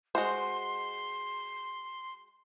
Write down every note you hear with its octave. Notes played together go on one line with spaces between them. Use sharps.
G#3 F#4 C5 C6